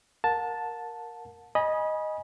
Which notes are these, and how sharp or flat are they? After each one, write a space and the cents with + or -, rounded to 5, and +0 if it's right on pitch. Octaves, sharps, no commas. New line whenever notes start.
A#4 +0 F#5 -40 A5 +0
D#5 +0 G#5 +0 B5 -30